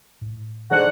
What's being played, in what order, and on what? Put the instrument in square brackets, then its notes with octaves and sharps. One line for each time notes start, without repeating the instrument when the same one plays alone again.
[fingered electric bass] A2
[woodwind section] G#2 D3 F#5 [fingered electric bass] E3 G3 C#4